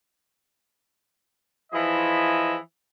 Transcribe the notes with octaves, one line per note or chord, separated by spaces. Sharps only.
E3 F3 E4 G#4 D#5 E5